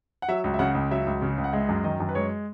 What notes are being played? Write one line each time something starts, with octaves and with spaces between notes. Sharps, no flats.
F#5
F#3 E5
C#2
E5
C#3 F#5
C#2
F#3 E5
C#2
C#3
C#2
F#5
G#3 E5
F#2
D#3 D#5
F#2
B4
G#3 C#5